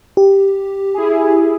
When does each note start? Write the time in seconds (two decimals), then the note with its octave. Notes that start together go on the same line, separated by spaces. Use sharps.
0.17 G4
0.94 E4 G#4